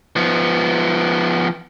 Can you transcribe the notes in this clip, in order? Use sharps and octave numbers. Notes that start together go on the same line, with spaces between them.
F3 B3